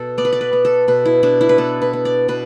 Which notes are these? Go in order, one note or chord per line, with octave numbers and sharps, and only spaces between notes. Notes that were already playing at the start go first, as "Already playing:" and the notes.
Already playing: B2 A4
B3 D5
B4
D5
B4
B3
A4
B2 B4
E4
B2 D4
E4
B4
B3 A4
B4
B3
D5
B2 B4